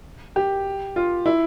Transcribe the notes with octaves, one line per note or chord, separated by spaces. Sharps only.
G4
F4
E4